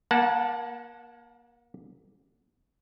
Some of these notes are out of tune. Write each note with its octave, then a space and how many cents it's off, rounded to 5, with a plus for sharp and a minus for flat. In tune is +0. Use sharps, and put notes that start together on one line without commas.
A#3 +25 F#5 -15 A5 +0